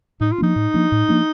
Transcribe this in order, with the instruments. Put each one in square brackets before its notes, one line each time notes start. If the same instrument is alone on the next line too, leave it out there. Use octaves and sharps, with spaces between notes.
[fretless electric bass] A2 [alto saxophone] D#4
[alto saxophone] F4
[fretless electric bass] F3 A#3 D4 [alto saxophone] D#4
[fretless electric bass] A2
F3 A#3 D4
A2
F3 A#3 D4